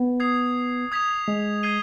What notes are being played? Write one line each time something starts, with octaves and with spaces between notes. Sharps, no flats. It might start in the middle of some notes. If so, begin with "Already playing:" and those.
Already playing: B3
D#6 G#6 C7
D#6 G#6 B6 F7
G#3
G#6 C7 D#7 G7